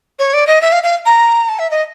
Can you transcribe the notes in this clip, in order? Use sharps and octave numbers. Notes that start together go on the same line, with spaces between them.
C#5
D5
D#5
E5
F5
F5
A#5
A5
E5
D#5